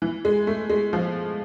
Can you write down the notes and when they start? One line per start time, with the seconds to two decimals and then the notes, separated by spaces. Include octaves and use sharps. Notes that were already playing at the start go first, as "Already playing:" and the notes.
0.02 E3
0.25 G#3
0.47 A3
0.70 G#3
0.93 F3